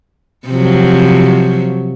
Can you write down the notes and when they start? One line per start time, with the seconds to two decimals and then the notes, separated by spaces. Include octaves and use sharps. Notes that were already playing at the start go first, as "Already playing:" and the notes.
0.48 C3 F3 F#3